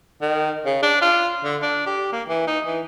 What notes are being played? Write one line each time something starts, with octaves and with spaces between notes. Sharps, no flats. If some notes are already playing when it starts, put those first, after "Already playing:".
D#3
C#3
D4
F4
D3
D4
G4
A#3
E3
D#4
E3